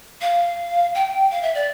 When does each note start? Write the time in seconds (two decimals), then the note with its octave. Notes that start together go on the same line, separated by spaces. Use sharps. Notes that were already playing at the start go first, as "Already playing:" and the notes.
0.21 F5
0.95 G5
1.30 F5
1.42 E5
1.55 D5